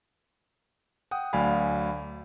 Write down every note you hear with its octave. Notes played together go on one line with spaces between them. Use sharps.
F#5 G5 D#6
D2 F#3 D5 F5 G#5 B5